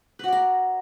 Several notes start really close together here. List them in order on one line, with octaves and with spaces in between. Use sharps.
B4 F#4 D5 A#4